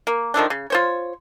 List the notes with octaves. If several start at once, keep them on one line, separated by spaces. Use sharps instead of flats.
A#3
D#3 F3 A3 D4
C#3
F4 C5 C#5